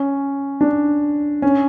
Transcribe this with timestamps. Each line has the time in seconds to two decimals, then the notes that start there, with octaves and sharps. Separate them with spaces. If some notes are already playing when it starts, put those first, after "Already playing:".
Already playing: C#4
0.61 D4
1.42 C#4